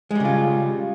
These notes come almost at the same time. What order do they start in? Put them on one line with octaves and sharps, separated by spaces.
G#3 G3 C#3 F4